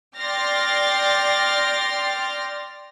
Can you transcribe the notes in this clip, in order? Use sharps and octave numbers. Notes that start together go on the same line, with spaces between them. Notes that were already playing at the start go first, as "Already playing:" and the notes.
D5 G5 C6 F6 A6 A#6